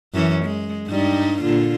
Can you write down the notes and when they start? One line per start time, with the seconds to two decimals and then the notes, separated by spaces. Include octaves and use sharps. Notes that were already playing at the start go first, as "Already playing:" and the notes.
0.14 F#2 E3 C#4
0.45 G#3
0.88 G2 G3 D#4
1.42 A#2 D3 F4